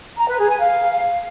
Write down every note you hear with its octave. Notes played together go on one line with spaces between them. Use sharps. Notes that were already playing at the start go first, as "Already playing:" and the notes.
A#5
B4
G#4
G#5
F5